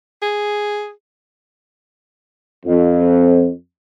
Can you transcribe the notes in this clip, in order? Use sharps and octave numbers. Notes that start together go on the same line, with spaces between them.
G#4
F2